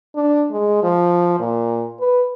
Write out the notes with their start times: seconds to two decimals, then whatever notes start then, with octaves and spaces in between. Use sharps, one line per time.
0.15 D4
0.51 G#3
0.83 F3
1.39 A#2
2.00 B4